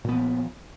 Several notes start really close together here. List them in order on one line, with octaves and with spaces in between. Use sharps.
A#2 B3 F3